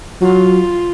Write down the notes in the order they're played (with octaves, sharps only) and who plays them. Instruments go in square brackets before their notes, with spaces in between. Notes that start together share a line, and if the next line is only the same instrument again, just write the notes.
[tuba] F#3 [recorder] F4